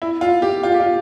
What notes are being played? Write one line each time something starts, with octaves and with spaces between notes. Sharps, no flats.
E4
F4
G4
F4
G4
F4